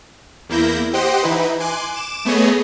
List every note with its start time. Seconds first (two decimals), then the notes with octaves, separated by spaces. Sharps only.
0.49 E2 A#3 E4 G6 A#6
0.93 G4 C5 D#5 F#5 G5 C6
1.23 E3 D#4 E4 B4
1.60 G#5 C6 D6 F#6
1.94 D6 E7
2.25 A3 B3 G#4 C#5 D#5